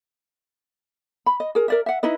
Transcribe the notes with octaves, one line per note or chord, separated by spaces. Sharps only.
B5
D#5
G#4 A#4
A#4 D5 E5
E5 F#5
D#4 E4 B4 D#5